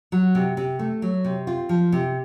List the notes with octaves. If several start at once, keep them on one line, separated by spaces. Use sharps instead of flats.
F#3
C3
C3
A3
F#3
C3
C4 F4
F3
C3